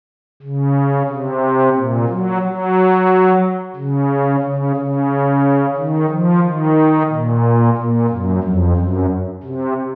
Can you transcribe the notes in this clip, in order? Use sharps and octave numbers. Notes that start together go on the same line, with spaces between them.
C#3
C3
A#2
F#3
F#3
C#3
C#3
C#3
D#3
F3
D#3
A#2
A#2
F#2
F2
F#2
C3